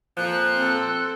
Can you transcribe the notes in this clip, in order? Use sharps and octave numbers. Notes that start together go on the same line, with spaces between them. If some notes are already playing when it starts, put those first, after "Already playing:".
F2 A#2 F3 F#6
C4 A4